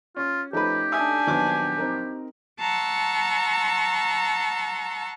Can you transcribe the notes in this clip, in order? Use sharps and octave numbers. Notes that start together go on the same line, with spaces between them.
C#4 F4
F3 A3 C#4 D#4 G4 B4
D4 E5 G#5 D#6
A#1 D#3 F#3 B3 D6
C4 D#4 A#4
F#5 A5 A#5 C6 C#6 E6